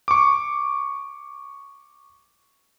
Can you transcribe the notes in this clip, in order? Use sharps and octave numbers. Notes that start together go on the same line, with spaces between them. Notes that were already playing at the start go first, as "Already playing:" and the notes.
C#6 D6